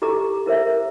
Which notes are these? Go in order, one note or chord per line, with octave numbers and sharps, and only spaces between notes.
E4 G4 A4 A#5 D6
E4 A#4 C5 E5